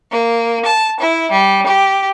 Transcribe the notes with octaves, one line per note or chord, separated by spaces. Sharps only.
A#3
A5
E4
G3
G4